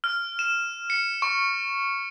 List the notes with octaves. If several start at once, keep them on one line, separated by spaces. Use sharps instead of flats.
F6
E7
C#7
C#6